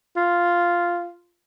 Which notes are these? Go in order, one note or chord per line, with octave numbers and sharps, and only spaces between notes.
F4